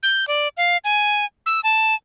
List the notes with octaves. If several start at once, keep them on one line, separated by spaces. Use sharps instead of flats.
G6
D5
F5
G#5
E6
A5